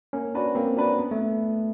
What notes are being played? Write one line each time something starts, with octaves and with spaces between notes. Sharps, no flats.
A#3 C#4
D4 F#4 B4 D5
A#3 C4
D4 F#4 B4 D5
B3
A3